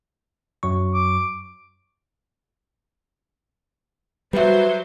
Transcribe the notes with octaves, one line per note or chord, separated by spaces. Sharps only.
F#2 F#3 C#6
D6
F#3 G3 B4 C5 E5